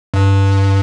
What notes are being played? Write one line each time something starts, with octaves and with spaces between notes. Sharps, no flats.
G2